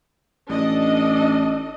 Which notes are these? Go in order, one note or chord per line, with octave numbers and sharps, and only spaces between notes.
A1 D4 A4 D#5